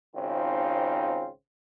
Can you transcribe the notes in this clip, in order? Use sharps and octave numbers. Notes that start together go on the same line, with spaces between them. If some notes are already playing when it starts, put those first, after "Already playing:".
G#1 C#3 C4 D#4 F4